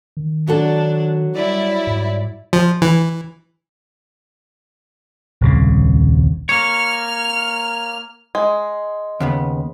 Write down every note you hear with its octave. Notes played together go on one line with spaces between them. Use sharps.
D#3
F#3 D4 F#4 A4
G3 E4 D5
G#2
F3
E3
D#1 C2 C#3
A#3 C#5 F6
G#3
D#2 C#3 B3